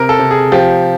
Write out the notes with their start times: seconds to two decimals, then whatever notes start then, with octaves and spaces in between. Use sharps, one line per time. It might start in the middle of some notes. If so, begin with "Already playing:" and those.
Already playing: C3 C4 A#4
0.09 A4
0.19 C3
0.31 G#4
0.52 F3 G4